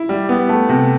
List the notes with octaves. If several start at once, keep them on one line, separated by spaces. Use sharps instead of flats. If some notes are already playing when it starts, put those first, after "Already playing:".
Already playing: E4
G3
B3
A3
C3